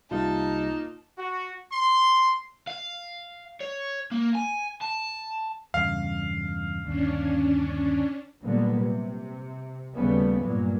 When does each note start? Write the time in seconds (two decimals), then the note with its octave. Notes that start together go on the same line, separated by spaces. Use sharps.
0.11 C2 C3 A#3 D#4 F4 A5
1.17 F#4
1.71 C6
2.67 F5
3.61 C#5
4.12 A#3
4.35 G#5
4.82 A5
5.74 E2 G2 C#3 F5
6.85 G1 D#2 C#4 D4
8.43 A#2 D3 F#3 G3 A#3 B3
8.76 C3
9.96 D#2 C#3 G3 A3 B3
10.41 G2 A#2 F#3 A#3